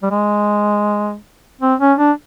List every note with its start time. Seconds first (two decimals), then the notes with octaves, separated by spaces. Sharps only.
0.03 G3
0.11 G#3
1.61 C4
1.80 C#4
1.98 D4